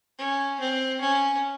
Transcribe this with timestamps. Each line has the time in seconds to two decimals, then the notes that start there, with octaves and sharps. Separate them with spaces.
0.18 C#4
0.60 C4
1.00 C#4